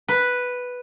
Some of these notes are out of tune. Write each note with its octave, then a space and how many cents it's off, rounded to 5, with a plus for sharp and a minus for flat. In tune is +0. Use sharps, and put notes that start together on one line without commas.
B4 +0